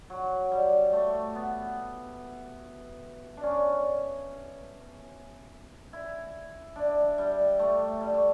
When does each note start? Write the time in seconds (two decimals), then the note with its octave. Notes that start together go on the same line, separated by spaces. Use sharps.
0.10 F#3
0.52 G3
0.93 A3
1.35 B3
3.37 D4
3.43 C#4
5.93 E4
6.76 D4
7.18 G3
7.59 A3
8.01 G3
8.14 A3